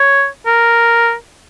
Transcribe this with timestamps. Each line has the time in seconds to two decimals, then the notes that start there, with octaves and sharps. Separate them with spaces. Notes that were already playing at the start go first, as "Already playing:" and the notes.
Already playing: C#5
0.46 A#4